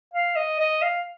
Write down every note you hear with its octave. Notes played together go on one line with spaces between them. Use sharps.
F5
D#5
D#5
F5